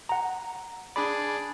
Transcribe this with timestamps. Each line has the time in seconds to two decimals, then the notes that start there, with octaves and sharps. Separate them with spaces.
0.09 F#5 A#5
0.96 D4 G#4 D5 B5